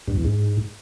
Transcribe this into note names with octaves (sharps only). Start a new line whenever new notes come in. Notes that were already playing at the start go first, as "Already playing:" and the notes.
G2
E2
G#2